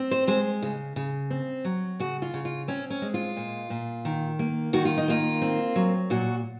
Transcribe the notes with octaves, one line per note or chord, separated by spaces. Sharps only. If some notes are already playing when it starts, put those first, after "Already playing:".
Already playing: C4
C5
G#3 C5
C#3
C#3
C4
F#3
C#3 F#4
F4
C#3
F4
C4 C#4
C#4
G#3
F4
A#2
A#2
D#3
A#3
D#3 F#4
F4
D#4
A#3 F4
C4
F#3
A#2 F#4